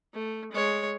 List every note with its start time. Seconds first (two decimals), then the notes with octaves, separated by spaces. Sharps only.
0.14 A3
0.52 G#3 C#5